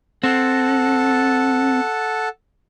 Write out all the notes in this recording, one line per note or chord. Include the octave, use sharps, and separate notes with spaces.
C4 A4 F#5 A5